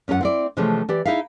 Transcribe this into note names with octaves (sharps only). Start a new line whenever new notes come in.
F#2 C#4 F4 A4 F#5
C4 E4 D5
C3 E3 F3 G#3 A3 C#4
E3 G4 D5
D#4 E4 G#4 E5 F5